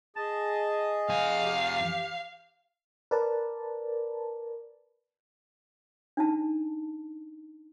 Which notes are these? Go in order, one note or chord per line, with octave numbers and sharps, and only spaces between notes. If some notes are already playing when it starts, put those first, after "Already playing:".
G#4 D#5 A5
F2 F5 G#5
G4
A#4 B4 D5 A5
D4 D#4 A5